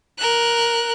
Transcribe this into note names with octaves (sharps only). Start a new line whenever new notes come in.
A#4 F#6